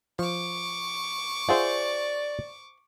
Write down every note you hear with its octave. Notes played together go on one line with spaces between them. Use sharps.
F3 C#6 D6
F4 G#4 C5 D5 E5 F#5